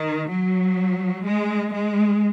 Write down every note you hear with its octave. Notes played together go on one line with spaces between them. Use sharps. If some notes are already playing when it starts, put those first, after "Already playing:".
Already playing: D#3
F#3
G#3
G#3